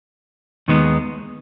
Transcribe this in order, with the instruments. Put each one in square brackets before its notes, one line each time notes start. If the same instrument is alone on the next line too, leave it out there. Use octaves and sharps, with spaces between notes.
[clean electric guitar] D#2 D#3 G#3 B3 D#4